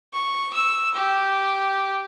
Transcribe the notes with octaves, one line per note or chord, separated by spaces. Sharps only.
C#6
E6
G4